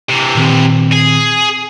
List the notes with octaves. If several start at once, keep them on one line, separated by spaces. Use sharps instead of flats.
C3 E3
A#2 D#3 C4
G#4